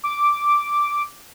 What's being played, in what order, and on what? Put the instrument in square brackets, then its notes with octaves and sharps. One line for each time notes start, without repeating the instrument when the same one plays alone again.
[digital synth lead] D6